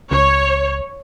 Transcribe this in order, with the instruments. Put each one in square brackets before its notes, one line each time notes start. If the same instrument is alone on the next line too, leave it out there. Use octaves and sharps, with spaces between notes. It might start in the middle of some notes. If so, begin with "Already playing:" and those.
[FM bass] C#2 [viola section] C#5